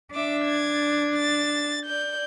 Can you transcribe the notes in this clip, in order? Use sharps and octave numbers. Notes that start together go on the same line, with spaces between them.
D4 E5 D6
G#6 A6
A6
D5 G6